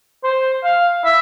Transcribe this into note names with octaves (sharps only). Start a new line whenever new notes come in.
C5
F5
E5